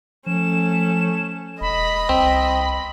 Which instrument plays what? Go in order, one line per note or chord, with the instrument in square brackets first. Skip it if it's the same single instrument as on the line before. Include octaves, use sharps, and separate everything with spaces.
[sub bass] F3 [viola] A3 C#4 [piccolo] E7
[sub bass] E1 [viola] D#5 [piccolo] B5
[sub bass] C2 [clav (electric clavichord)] C4 [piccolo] B5